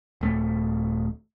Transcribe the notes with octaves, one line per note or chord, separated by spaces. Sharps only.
D#1 A3